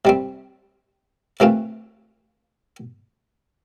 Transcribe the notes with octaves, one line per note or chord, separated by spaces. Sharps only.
C3 G3 C4
C3 E3 A3 C4 F4